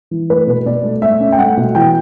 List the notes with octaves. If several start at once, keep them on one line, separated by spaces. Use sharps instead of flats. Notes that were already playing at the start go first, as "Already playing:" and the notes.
E3
A3 B4
B2
B2 D5
A3
A3 E5
C#4
G5
A3 F#5
B2
E3 G5